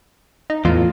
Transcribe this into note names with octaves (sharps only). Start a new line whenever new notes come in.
D#4
E2 A2 F4